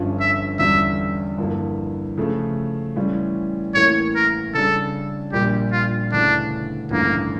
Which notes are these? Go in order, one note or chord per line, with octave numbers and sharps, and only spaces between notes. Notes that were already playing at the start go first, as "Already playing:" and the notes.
Already playing: G1 G2 F3 C#4 F4
E5
E2 D3 G3 C#4 F4 E5
G2 D3 F3 A#3 E4
C#3 F3 A3
A2 E3 G3 C#4 F4
A1 A2 E3 A#3 C#5
A#4
C#3 G3 D4 A4
A#1 A#2 G3 G4
F4
D2 C#3 E3 D4
A1 G2 D3 F3 A#3